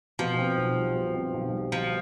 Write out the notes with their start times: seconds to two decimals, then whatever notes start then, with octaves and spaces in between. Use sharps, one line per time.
0.19 B2 F3
0.39 C4
0.57 B1
0.76 G3
0.96 B2
1.14 C4
1.34 B1
1.52 G3
1.72 B2 F3